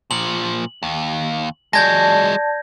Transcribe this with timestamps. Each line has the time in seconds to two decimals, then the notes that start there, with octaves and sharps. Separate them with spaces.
0.11 A#2 F3 F#7
0.83 D#2
1.73 F#3 G#3 D5 A5 G6 G#6 A#6